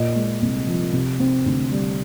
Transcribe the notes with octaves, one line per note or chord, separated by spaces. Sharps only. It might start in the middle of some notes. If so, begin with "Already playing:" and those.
Already playing: A#2 D#5
G#3
C2
F3
C3
C4
D2
G3